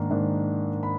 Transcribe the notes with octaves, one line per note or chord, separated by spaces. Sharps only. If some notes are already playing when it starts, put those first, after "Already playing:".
Already playing: G#2 D#3 A#3 D4
G#2 D#3 A#3 D4
B5